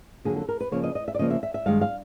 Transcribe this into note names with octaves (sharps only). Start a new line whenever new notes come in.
F2 D3 F#3 A#3 G#4
A4
A#4
B4
C#3 F3 A#3 C#5
D#5
D#5
E5
D5
C#3 F3 A#3 D#5
E5
E5
E5
G2 D#3 G#3 F5
F5